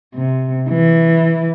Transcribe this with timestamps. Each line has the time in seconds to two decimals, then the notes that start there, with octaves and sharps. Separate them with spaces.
0.15 C3
0.69 E3